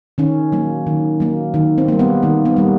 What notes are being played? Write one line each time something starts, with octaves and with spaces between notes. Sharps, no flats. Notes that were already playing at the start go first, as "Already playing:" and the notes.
D#3 C#4
F#3 A#3
D#3
F#3 A#3
D#3
C4
G3 A#3
B3
D#3 A#3
B3
G3 A#3